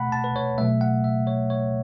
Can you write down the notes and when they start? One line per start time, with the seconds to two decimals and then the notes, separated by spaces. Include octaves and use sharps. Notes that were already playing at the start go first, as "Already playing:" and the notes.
Already playing: B2 A3 F#5 A5 B5
0.12 A5
0.24 B4
0.36 C#5
0.58 B2 F#3 A3 E5
0.81 F#5
1.04 E5
1.27 C#5
1.50 C#5